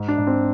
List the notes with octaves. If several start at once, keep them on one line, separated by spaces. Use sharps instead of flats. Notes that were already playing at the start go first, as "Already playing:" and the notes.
Already playing: G#2
D4
G#2
C4